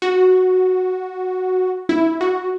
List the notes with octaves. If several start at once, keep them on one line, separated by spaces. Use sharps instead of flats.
F#4
E4
F#4